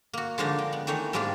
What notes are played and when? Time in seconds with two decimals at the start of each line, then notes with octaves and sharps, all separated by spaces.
0.13 A#3 F#4
0.38 D3 F3 G#3 A#3 D4 D#4
0.58 G5
0.72 B3
0.87 D#3 E3 A3 D#4 C#5 F#5
1.13 G#2 G3 G#3 A#3 D4 G#4